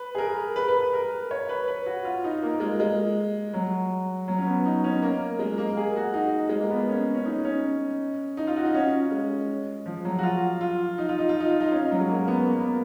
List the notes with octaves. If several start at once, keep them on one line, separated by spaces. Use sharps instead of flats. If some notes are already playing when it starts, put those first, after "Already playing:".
Already playing: B4
G#4
A#4
B4
B4
B4
A#4
C#5
B4
B4
F#4
F4
D#4
A#3
G#3
G#3
F#3
F#3
C#4
B3
D#4
C#4
A#3
G#3
A#3
G#4
F#4
D#4
G#3
A#3
B3
C#4
C#4
D#4
C#4
D#4
F4
F#4
D#4
C#4
G#3
F3
F#3
F#4
F4
F4
D#4
F4
D#4
F4
D#4
F4
D#4
C#4
F#3
G#3
A#3
A#3
B3
A#3
B3